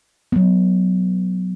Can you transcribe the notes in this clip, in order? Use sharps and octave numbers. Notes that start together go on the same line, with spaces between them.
F#3 B3